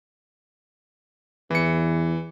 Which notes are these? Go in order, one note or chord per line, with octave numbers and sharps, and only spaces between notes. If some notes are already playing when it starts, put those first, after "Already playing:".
E2 E3 C#7